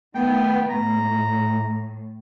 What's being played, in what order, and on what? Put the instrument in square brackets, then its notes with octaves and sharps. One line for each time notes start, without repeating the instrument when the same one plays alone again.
[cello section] D#3 A3 B3 [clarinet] G5
[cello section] A2 [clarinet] A#5